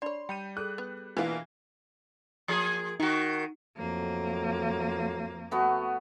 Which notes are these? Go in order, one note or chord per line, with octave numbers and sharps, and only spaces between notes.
D4 C#5 D5 B5 C6
G3 G5 B5 G6 D#7
G#4 A4 F#6
B3
B2 E3 A#3 D4 E4 F4 B4 F#5
F3 A#3 G#4
D#3 D#4 F#4
F2 A2 F#3 A3 A#3
A3 B3 F#4